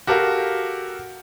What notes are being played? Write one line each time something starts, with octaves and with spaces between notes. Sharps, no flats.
F#4 G4 A4 A#4 F5